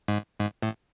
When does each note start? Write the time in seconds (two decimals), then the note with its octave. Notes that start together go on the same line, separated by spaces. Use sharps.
0.08 G#2
0.40 G#2
0.63 A2